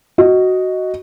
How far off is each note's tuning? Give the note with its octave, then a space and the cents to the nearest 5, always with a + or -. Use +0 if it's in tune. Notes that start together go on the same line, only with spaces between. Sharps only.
F#4 +5 D#5 +5